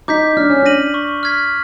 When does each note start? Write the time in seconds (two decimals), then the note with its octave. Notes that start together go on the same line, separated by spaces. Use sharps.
0.08 D#4 D6 G6 B6
0.37 D4 F6
0.50 C#4
0.62 D4 A#6 D#7 F#7
0.94 C#6
1.23 F6 G#6 B6